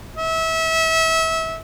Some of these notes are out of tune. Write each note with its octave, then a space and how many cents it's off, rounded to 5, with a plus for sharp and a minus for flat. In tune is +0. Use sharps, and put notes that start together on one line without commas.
E5 -25